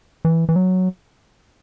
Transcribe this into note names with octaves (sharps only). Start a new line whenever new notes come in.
E3
E3
F#3